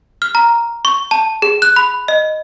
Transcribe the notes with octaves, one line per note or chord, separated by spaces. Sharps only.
F6
A#5
C#6
A5
G#4
F#6
B5
D#5